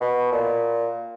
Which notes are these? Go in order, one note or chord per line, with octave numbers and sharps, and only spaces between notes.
B2
A#2